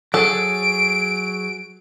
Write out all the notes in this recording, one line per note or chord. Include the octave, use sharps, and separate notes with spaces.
F#3 G#4 A4 D7